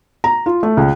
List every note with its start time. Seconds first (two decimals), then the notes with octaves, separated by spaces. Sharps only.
0.24 A#5
0.46 F4
0.63 A3
0.77 C#2